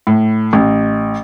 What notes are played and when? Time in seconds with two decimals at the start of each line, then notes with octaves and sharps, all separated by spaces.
0.07 A2
0.53 A1